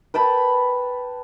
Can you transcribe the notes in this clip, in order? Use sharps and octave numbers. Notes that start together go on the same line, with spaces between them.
B4 G5 A5 B5